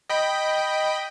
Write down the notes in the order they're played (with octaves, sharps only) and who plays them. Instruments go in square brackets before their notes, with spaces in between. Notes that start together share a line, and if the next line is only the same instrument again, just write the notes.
[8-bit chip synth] D#5 G5 B5